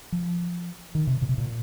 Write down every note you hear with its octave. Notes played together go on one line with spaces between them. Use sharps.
F3
D#3
C3
A#2
C3
A#2